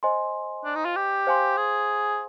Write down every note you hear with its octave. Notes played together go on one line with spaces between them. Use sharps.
C5 D#5 G#5 C6
D4
D#4
F4
G4
C5 F5 G#5 C6
G#4